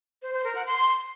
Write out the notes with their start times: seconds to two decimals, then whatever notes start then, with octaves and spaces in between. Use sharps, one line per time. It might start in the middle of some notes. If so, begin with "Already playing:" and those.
0.22 C5
0.33 C5
0.44 A#4
0.55 F#5
0.66 C6